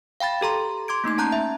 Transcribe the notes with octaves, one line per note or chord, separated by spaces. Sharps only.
F5 G5 B5 A6
G4 A4 A#5 C6
C6 D6 G#6 D7
A3 A#3 D#4 G#6
C#4 A5 A#5 F#6 G6
E5